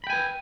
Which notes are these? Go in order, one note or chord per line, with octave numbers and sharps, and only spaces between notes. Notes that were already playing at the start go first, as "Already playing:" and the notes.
B4 G5 G#5 B5